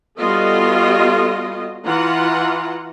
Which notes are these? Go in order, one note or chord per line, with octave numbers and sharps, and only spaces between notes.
G3 B3 F4 F#4 A4 D#5
E3 F4 F#5 A#5